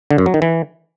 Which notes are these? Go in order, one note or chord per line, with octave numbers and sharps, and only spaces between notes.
D3
F#2
F#3
D#3
E3